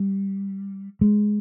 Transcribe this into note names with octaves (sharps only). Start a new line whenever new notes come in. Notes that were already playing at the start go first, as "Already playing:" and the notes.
Already playing: G3
G#3